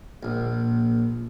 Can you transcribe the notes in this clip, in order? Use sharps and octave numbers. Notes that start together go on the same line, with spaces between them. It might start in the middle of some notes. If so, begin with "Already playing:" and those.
A#1